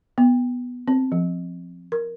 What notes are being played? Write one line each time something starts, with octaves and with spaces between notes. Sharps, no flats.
B3
C4
F3
A#4